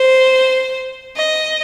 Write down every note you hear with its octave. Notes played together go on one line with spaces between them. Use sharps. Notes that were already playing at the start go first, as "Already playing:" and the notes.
Already playing: C5
D#5